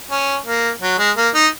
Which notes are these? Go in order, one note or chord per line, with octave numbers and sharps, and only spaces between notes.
C#4
A#3
F#3
G#3
A#3
D#4